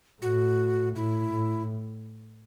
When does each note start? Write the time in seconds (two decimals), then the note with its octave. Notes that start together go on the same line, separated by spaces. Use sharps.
0.22 A2 F#4
0.96 A2 E4
1.33 A2